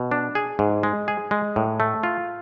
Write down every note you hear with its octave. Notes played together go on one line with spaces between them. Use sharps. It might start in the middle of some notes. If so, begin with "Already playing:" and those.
Already playing: B2
D4
G#4
G#2
G#3
G#4
G#3
A2
A3
F4